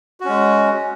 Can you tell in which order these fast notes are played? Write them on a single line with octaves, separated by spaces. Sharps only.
F#4 C#4 G#3